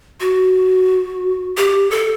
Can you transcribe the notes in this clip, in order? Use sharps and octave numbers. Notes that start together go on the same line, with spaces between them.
F#4
G4
A4